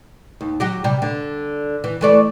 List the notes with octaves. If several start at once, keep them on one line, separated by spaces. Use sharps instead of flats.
D#2
F#3 F#4 G4
C3 G3
D3
E3
E3 A3 D5